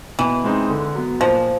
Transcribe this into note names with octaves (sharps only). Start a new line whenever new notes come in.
B2 E3
G#3 C4 D#4
D3
F#3 B3
A#2 F3